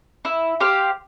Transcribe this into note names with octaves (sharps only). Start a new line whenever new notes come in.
E4
G4 C5 F5